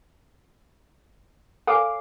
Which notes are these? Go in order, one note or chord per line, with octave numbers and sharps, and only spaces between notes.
A4 C#5 F5 G#5 D6